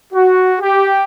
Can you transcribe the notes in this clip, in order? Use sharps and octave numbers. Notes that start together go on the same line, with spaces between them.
F#4
G4